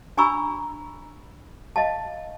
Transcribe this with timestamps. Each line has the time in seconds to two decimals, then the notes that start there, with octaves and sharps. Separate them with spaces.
0.17 D4 G#5 A#5 B5 C#6 E6
1.76 D#5 F5 A5